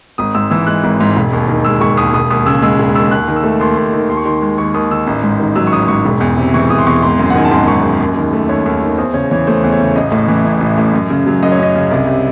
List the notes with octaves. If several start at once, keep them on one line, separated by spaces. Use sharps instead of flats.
G#1 D#6
G#2 E6
E3 E6
G#3 F#6
G#1
G#2
E1
D#2
D#3
G#3 E6
E1 C#6
D#2 D#6
E1 D#6
D#2 D#6
C#3 E6
G#3 E6
E1
D#2 E6
D#2 F#6
D#3
E6
A3
D#2 C6
D#2
D#3
D#2 C6
C#6
D#3 C6
G#3
D#2 C#6
D#2 D#6
D#3 E6
A1
G#2
D#3
F#3 E6
C#6
A1 D#6
G#2 C#6
E1
E2
C3
E3 C#6
E1 D#6
C6
E2 C#6
G#1 C6
F#2
F#5
D#3 G#5
A5
G#1 C6
G#1 C#6
F#2
D#2
D#3
A3
D#2 C#5
D#2
D#3
E2 C5
C#3 C#5
E3 C#5
A3 C5
E2
C#5
C#3
A1 D#5
A2
E3
A1
A1
A2
F#2
C#3
F#3
F#2 D#5
C#5
F#2 D#5
C#3
C2
C3